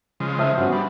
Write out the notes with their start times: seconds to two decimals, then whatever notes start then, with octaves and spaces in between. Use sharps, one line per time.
0.20 C#3 F3 G#3
0.39 C5 E5 A5 F6
0.58 G2 B3 C#4 F#4
0.72 G3 D4 B5